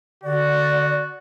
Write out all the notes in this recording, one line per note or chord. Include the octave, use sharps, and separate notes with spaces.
D3 F#4 D5